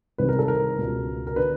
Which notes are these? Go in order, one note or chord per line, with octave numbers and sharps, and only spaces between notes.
C2 C3 D#3 B4
A#4
A4
A#4
C#2 B2
A#4
D3 B4